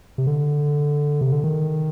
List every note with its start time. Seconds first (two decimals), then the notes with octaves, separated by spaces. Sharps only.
0.18 C3
0.27 D3
1.21 C3
1.33 D3
1.44 D#3